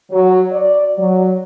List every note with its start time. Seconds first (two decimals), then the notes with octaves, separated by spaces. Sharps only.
0.11 F#3
0.51 D5
0.98 F#3